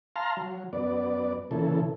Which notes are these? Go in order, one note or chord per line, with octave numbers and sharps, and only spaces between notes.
F5 A5 A#5 C6 F6
F#3
F#2 B3 D5
A#2 C#3 E3 A4